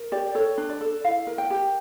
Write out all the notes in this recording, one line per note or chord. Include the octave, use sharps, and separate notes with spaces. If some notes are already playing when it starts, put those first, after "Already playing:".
Already playing: A#4
G4 D5
A4 C#5
D4
D5
A4
E4 F5
A#4
G5
G4